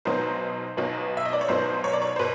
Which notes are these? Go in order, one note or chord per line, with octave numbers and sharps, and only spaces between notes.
B1 B2 F#3 B3 D#4 C5
B1 B2 F#3 B3 D#4
E5
D#5
D5
C#5
B1 B2 F#3 B3 D#4 C5
C#5
D5
C#5
C5
B2 B4